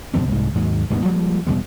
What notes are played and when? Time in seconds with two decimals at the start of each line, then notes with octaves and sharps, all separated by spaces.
0.14 F2 B2 D3 C4
0.28 C2 G#2
0.55 D#2 G#2 F#3
0.90 D#1 D2 G#2 B3
1.05 F3 G3 G#3 A#3
1.47 E2 B2 G3 G#3